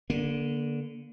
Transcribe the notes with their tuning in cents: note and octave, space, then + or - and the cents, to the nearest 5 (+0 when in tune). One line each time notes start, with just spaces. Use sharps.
D3 -15 A#3 +20